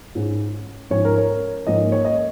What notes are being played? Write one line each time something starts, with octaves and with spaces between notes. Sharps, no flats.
G#2 G#3 C#4
G#2 F3 C#4 C#5
A#4
C#5
G#2 F3 A#3 C#4 D#5
C#5
D#5